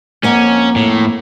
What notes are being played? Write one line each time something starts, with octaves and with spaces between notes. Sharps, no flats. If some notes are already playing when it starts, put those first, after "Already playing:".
F2 A#3 C#4 F#5
A2